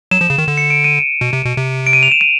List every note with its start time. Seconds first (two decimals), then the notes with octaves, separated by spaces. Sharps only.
0.11 F#3 E7
0.21 F3
0.30 C#3
0.38 D#3
0.48 D3
0.58 C#7
0.70 D7
0.84 D#7
1.21 B2
1.33 C3
1.45 B2
1.57 C3
1.87 D7
1.93 D#7
2.03 F7
2.11 E7
2.21 D#7